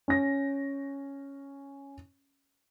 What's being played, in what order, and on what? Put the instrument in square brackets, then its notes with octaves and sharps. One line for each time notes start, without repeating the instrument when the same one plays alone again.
[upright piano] C#4 A#6